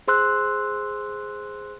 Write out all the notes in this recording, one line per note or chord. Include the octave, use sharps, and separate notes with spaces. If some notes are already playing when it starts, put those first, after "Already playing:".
G#4 C5 C6 E6 F#6